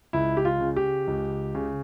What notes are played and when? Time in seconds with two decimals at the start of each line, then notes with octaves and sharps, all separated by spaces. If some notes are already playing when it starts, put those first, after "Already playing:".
0.13 C#2 E4
0.37 G4
0.45 F4
0.60 C#3
0.76 G4
1.07 C#2
1.55 C#3